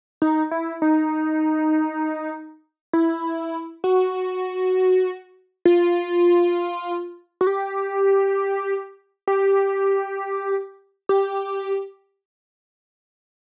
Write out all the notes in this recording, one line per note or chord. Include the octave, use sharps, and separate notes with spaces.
D#4
E4
D#4
E4
F#4
F4
F#4
G4
G4
G4